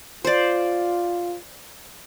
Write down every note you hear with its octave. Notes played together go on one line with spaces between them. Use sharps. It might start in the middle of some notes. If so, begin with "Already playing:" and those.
F4 C5 D5